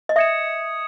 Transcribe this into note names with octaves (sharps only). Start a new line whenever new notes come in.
D#5
E5 D#6 G#6 C#7 E7